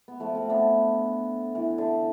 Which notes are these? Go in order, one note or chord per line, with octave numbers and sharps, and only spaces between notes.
B3
F3 A3
A3 C4
B3 D4
E3
D3